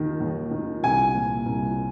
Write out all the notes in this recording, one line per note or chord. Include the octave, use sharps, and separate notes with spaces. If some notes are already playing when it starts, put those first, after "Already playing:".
Already playing: D#2 D#3
D#2
D#3
C2 G#5
A#2 F3
C2